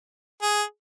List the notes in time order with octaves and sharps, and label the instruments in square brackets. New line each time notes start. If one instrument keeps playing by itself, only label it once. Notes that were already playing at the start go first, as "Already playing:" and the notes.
[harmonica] G#4